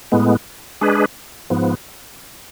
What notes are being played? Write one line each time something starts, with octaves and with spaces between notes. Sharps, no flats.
A2 G#3 B3
G#3 D4 G#4 B4
G#2 F3 B3